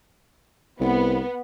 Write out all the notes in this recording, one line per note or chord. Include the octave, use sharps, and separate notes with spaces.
C2 B3